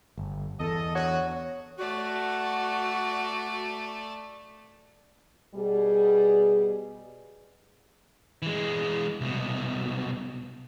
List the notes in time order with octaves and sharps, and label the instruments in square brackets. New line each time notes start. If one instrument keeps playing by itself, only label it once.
[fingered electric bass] G1
[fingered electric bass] E2 [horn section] A4 D#5
[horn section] D3 F#4 [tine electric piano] C#5
[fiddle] A3 D5 [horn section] F#4
[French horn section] B2 G3 G#4
[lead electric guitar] E3 G#3
C2 B2